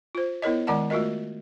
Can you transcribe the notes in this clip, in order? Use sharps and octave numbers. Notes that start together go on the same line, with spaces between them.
F4 C5
B3 E4 A#4 C#5 D#5
D#3 G#3 D5 F#5 A5
A3 F4 F#4 A#4 D#5